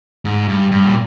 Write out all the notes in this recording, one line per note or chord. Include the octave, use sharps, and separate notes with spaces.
G#2
G2
G2
A#2